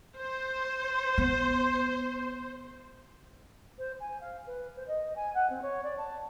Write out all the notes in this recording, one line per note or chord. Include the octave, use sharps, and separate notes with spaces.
C5
B3
C5
G#5
F5
B4
C5
D#5
G#5
F#5
C4
C#5
D5
A5